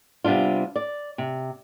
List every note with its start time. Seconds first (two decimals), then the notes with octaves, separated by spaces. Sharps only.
0.24 C3 G3 B3 D4 F4
0.76 D5
1.18 C3